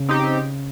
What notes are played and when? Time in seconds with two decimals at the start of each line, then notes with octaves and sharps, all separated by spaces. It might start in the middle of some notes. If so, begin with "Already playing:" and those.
Already playing: C#3
0.09 C4 D#4 G4